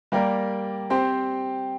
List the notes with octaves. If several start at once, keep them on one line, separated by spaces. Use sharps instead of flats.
G3 A#3 G4 A#4 D5
C4 G4 C5